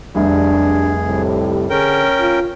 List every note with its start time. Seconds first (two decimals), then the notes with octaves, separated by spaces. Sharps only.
0.15 F1 C2 D4 G#4
1.05 A2 C3 G3
1.70 D3 C#4 G#4 A#4 G5
2.19 F4